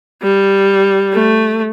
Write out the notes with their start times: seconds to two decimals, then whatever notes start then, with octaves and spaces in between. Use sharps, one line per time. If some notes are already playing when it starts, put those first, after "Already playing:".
0.22 G3
1.13 A3